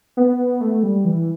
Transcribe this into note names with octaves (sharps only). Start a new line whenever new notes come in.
B3
A3
G3
E3